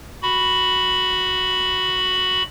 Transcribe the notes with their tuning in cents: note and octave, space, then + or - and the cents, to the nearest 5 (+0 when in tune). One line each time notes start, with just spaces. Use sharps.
F#4 +0 B5 +0